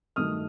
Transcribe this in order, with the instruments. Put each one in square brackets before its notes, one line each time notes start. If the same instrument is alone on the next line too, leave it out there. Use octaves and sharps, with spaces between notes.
[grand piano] G2 D#3 F#3 A3 D#6 F6